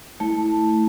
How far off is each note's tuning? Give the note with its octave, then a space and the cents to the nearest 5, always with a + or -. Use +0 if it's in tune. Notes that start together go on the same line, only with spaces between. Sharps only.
A3 +0 E4 -15 A5 +0